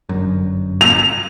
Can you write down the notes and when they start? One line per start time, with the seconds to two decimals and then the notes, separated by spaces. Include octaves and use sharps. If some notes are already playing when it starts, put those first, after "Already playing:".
0.09 G1 F#2
0.81 F7